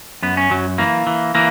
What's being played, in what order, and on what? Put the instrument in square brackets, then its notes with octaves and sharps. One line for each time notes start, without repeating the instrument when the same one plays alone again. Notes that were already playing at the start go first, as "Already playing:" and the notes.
[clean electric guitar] F#2 B3
C#4
F#2 F#3
E3 A#3
E3
E3 A#3